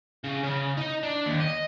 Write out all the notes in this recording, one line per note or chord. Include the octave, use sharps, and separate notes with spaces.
C#3
C#3
D#4
D4
D#2
D#5